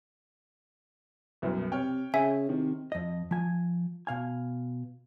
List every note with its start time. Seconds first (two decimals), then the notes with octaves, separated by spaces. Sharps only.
1.42 C2 F#2 B2
1.72 C3 C#5 G5 F6
2.14 C#3 E5 G#5
2.49 C3 D#3
2.92 F2 D#5
3.31 F3 G#5
4.07 B2 F5 G#5